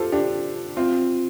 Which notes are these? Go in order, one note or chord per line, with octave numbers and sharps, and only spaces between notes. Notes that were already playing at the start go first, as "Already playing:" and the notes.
Already playing: F4 G4 A4 C5
D4 G4
C4 F4